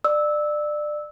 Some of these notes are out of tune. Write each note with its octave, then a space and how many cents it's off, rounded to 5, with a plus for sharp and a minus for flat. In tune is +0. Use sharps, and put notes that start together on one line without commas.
D5 +25 E6 -15